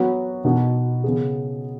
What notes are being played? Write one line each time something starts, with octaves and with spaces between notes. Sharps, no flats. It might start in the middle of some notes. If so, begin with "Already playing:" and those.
Already playing: F#3 B3 F#4
B2 B3 D#4 F#4
C#3 B3 G#4